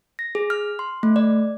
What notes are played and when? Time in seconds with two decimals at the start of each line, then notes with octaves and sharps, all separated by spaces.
0.19 A#6
0.35 G#4
0.50 F6
0.79 C6
1.03 A3
1.16 D5